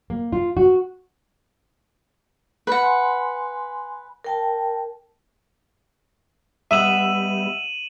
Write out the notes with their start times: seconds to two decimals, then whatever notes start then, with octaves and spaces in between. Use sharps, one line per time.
0.10 A#3
0.33 F4
0.57 F#4
2.67 B4 F#5
2.82 G#5 C6
4.24 A#4 G5 A5
6.71 G3 B3 D#5 E5 F#5 D#7 E7 F#7